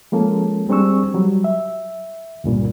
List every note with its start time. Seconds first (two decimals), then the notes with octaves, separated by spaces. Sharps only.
0.12 F3 G#3 A#3 C#4 A4
0.69 G3 C4 D4 G#4 C#6 E6
1.14 F#3 G3
1.44 E5
2.44 C#2 G2 A#2 C#3